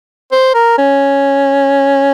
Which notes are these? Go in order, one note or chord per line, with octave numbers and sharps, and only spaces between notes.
C5
A#4
C#4